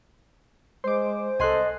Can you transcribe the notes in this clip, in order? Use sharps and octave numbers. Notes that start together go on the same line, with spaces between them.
G#3 C5 C6 D6
C2 A4 D#5 G#5 C6 F#6